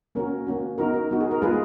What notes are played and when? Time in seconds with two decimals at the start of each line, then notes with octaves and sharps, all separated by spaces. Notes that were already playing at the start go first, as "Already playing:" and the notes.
0.15 A#3 C#4 F#4 A#4
0.47 A#3 C#4 F#4
0.78 B3 D#4 F#4 A#4
0.94 A#4
1.10 B3 D#4 F#4
1.20 G#4
1.31 A#4
1.42 G#3 B3 F4 G#4 B4